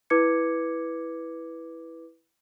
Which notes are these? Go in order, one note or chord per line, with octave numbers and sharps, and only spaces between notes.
E4 B4 D6 G#6 C#7